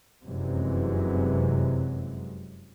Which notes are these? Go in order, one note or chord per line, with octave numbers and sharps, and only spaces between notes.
F1 F#2 C3 E3 F#3 G#3